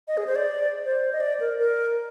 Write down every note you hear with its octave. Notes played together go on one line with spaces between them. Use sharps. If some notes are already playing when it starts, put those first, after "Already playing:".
D#5
G#4
C5
D5
C5
D#5
D5
A#4
A#4